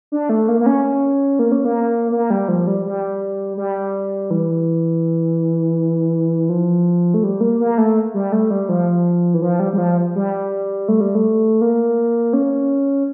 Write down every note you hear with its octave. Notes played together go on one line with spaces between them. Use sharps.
D4
A3
A#3
A#3
C#4
A#3
C#4
A#3
A#3
G3
F3
G3
G3
G3
E3
F3
A3
G3
A#3
A#3
A3
G3
A3
G3
F3
E3
F3
G3
G3
F3
G3
A3
G3
A3
A#3
C#4